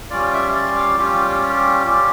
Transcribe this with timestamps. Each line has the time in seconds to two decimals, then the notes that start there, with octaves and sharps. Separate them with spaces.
0.10 G3 C#4 F4 D5
0.33 E5
0.55 D5
0.77 F5
0.99 G3 C#4 F4 G4
1.87 G3 C#4 F4